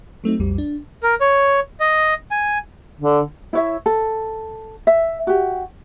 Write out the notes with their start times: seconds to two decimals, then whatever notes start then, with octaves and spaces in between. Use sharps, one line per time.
0.24 F#3 A3 C4 D#4
0.40 B1 F2 G3
0.58 D4
1.03 A#4
1.21 C#5
1.80 D#5
2.31 G#5
3.01 D3
3.53 E4 C#5 E5
3.86 A4
4.87 E5
5.27 F#4 G4